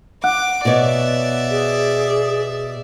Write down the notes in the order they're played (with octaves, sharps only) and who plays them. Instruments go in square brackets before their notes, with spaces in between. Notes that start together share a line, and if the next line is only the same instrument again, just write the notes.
[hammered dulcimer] F#5 [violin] D6
[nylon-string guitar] B2 C#5 [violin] D5 E5
[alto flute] G#4